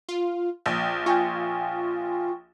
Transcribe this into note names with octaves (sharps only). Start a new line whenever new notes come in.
F4
A#1 G5
F4 G5 G#5 C#6